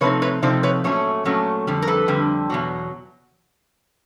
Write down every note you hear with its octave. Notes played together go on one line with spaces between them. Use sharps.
C3 F3 A3 C4 D#4 B4 C#5
B4 C#5
C3 F3 A3 C4 D#4 C5 D5
B4 C#5
A#2 F#3 A3 C#4 C#5
A#2 F#3 A3 C#4
F2 D3 G3
A#4
A4 B4
F2 D3 G3
E2 B2 F#3